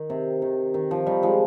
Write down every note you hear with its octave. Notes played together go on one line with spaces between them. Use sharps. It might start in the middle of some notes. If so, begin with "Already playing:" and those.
Already playing: D#3
C3
D#3
D#3
F3
D#3 G3
F3 G#3